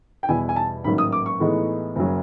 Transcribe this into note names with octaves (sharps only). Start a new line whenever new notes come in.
G5
E2 B2 G3 B3 E4 G#5
G#5
A5
A1 G#2 D#3 F#3 A#3 B5
D#6
D6
C#6
A2 E3 G#3 B3 D#4
F#1 F#2 C#3 F#3